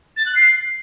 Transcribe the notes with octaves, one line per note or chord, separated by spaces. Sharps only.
A6
F#6
C7